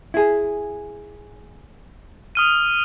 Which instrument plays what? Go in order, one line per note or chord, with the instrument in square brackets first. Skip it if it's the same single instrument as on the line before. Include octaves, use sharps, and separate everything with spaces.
[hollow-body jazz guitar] E4 G#4
[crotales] D#6 F6 D#7